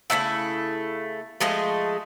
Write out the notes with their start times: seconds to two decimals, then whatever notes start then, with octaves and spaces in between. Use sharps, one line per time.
0.10 C#3 A3 D#4 E4
1.40 F3 G#3 A3 D#5